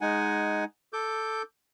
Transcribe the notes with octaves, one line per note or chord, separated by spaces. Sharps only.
G#3 D#4 F#5 G#5
A4 D6 G6